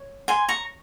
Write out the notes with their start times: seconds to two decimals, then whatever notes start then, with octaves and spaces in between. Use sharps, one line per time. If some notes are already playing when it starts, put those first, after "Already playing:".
Already playing: C#5
0.28 G#5 C6
0.49 A#5 C#6